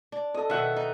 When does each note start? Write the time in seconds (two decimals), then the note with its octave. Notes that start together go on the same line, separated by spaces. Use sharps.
0.12 D4
0.35 A4 D#5
0.50 B2 D#3 E5 F#5
0.77 D#4